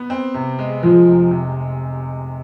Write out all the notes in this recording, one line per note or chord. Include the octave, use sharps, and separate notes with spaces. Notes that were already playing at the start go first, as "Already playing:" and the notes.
Already playing: B3
C4
C3
G#3
F3 G#3
F1
C3